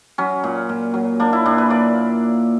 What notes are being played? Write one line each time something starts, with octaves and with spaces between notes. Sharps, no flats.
F#3 C#4
A#2
A#2
F#3
A#3 D4
E4
A#2 D4
B4
A#3 D5